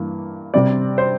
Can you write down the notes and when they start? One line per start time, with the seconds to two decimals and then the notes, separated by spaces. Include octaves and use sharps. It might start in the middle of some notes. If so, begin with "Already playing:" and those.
Already playing: G2 E3 A#3
0.54 C3 G3 C4 D5
0.98 C5